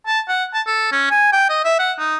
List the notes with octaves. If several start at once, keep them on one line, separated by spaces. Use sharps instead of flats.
A5
F#5
A5
A4
C#4
G#5
G5
D#5
E5
F#5
D#4